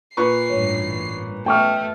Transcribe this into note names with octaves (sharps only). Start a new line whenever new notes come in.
A#2 B4 C#6 C7
A1 G2 C#5
F#2 B2 A3 G5 C#6 F6